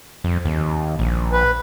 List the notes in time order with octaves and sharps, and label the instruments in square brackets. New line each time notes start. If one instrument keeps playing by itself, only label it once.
[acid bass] F2
D#2
A#1
[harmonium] B4